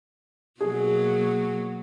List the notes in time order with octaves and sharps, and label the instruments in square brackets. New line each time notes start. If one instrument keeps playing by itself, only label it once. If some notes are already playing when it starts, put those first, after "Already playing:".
[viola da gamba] B2 F#3 A#3 [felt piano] G#4